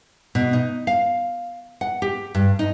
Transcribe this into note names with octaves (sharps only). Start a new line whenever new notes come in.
B2
D#4
F5
F#5
G4
G2
D#4